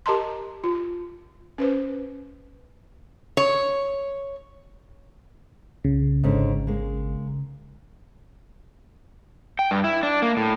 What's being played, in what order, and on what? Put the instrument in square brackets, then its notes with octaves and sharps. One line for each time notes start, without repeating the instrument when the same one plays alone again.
[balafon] G4 A#4 D#5 A5 A#5 C6
F4
C#4 B4 C5
[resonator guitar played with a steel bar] C#5
[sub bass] C2 [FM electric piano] C#3
[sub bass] G#1 [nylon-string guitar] G#2 D3 C#4
[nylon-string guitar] G#3 A#3
[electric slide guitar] G5
G2
E4
D4
A#3
A2